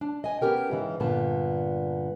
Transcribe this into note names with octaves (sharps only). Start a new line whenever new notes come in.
D4
D#5 G#5
B3 C#4 G4 A#4 G5
G#2 C#3 E3
G2 A#2 D3 B3 A5